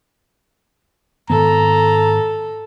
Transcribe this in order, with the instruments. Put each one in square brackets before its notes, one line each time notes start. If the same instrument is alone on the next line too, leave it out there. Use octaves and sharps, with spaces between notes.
[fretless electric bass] G#2 D#3 B3 [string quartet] A4 [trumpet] A#5